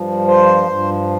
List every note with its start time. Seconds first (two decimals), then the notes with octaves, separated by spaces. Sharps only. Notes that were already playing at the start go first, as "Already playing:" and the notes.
Already playing: G2 F3
0.27 C5
0.69 G2 F3